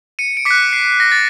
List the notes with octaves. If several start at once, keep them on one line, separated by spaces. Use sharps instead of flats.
C#7 D#7
D7
D6 B6 C#7
F#6
C7
A#6
A6